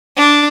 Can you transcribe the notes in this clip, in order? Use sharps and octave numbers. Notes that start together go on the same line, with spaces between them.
D4